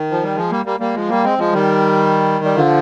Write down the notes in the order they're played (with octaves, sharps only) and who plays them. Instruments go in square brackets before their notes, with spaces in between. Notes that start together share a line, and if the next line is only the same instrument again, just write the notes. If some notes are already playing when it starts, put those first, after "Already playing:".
Already playing: [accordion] D#3
F3
G3
F3 G#3
G3 A#3
G3 A#3
G3 A#3
F3 G#3
G3 A#3
G#3 C4
F3 G#3
D#3 G3
G3
D3 F3